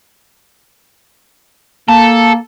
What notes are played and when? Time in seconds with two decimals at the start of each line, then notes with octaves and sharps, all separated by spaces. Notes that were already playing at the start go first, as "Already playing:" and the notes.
1.88 A#3 A4